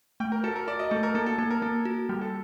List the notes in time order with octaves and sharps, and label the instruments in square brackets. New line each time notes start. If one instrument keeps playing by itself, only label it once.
[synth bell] A3 [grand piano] G5
[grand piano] A#4
[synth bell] F#4 [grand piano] A4
[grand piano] A#4
[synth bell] F#4 [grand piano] D5
[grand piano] D#5
[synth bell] A3 [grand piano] A4
[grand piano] A#4
[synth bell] A#3 [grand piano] A4
[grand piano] A4
[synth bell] A#3 [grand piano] A4
[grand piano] A#4
[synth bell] A#3 [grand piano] A4
[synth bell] F#4
[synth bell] G3 [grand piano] G4
[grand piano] A4